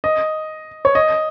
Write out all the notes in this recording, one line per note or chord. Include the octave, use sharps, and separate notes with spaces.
D#5
C#5
D#5